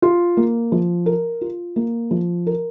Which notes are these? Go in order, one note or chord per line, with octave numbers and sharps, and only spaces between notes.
F4
A#3
F3
A#4
F4
A#3
F3
A#4